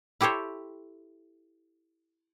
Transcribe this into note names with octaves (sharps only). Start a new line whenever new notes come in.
E4 G4 A4 C5 C#5